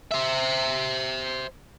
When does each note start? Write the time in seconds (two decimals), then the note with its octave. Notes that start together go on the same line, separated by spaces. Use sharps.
0.12 C5 E5